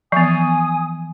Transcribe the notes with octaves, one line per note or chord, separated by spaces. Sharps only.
E3 F3 B3 G#5 D#6